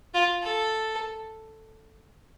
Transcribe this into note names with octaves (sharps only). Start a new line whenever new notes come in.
F4
A4